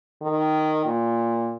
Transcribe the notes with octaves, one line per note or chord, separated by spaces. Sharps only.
D#3
A#2